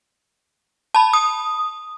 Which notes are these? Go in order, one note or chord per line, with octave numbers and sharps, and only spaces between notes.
A5 B5
D#6